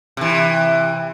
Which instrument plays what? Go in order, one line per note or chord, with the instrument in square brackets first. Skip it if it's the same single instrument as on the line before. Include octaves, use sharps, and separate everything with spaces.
[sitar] C3 E3